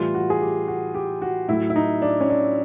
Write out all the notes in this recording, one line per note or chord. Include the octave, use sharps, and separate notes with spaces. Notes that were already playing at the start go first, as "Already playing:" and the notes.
Already playing: A2 E3 G3 F4
F#4
G#4
G4
F#4
G4
F#4
A2 F#3 E4
E4
D#4
D4
C#4
D4